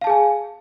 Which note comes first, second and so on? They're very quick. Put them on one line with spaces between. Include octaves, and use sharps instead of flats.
F5 A5 G#4 G#5